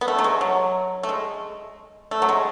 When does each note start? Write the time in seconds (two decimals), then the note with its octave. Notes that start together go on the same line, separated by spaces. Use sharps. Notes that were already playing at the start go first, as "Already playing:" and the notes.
0.01 B3
0.08 A3
0.19 F#3
0.24 G#3
0.41 F#3
1.03 A3
1.09 G#3
2.11 A3
2.22 F#3
2.29 G#3